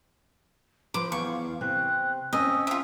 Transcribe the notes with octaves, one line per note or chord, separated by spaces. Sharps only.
F3 B4 C6 D6
E2 F5 C#6
C3 C4 F#6
C4 C#4 D#5 E6
F4 E5